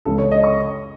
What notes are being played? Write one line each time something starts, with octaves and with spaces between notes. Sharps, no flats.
C#2 C#3 G#3 A4
C#5
D#5
C#6